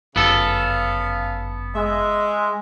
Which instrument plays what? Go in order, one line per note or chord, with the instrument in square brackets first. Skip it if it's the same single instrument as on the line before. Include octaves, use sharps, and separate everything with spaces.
[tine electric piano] G1 F#2 [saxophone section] C#3 F5 [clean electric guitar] B3 A4
[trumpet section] G#3 [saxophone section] E5